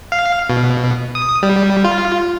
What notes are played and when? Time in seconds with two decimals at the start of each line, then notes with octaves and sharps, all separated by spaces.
0.12 F5
0.49 B2
1.15 D#6
1.43 G3
1.84 F4